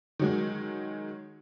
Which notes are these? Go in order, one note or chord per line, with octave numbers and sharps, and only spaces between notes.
D#3 F#3 G#3